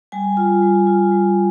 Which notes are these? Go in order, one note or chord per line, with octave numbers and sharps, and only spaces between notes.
G3 G#5
F4
G3
F4
G3